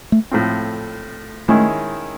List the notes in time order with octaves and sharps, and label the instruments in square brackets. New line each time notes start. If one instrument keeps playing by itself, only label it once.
[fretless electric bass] A3
[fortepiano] A2 F3 A3 C4
[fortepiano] D#3 G#3 C#4 E4 [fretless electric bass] A3